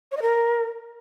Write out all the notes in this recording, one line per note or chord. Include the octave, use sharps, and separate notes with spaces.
C#5
D#5
A#4